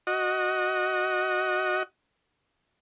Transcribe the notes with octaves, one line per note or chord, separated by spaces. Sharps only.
F#4 D#5